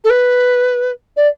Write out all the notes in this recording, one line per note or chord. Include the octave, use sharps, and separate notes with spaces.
A4
B4
D5